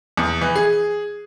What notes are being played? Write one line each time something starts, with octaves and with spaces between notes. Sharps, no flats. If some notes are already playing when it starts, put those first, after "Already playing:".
E2
E3
G#4